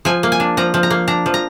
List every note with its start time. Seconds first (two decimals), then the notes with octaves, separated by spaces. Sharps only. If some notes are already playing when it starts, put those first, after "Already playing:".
0.05 F3 G#5
0.23 A#3
0.32 G#5
0.40 D4
0.57 F3 A#5
0.74 F3
0.83 A#5
0.90 A#3
1.08 D4 A#5
1.26 F3
1.34 A#5